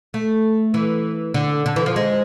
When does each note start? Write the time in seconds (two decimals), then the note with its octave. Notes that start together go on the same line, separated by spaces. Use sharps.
0.14 A3
0.74 E3
1.34 D3
1.66 D3
1.76 E3
1.86 F3
1.96 G#3